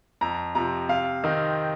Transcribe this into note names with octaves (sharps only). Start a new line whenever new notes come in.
F2 A#5
C3 F3 A#5
C3 F5
D#3 C4 D#4